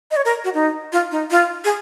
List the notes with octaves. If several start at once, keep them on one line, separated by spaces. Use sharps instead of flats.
D#5
C#5
A#4
F#4
D#4
F4
D#4
F4
G#4